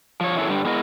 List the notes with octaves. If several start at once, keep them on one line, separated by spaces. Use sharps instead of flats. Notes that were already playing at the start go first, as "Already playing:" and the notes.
F3 C#5
F#2 E3 F#3 E4 G#4 A4
G2 D3 G3
G#3 B3 E4 G#4 A#4 D#5